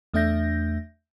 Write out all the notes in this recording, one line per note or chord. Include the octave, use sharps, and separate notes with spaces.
E2 A3 D4 E5 G6 A#6